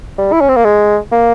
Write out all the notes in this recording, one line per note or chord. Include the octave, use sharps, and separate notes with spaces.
G3
E4
C#4
C4
A#3
G#3
A#3